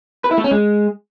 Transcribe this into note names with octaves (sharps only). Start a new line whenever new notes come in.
B4
E4
A3
C#4
G#3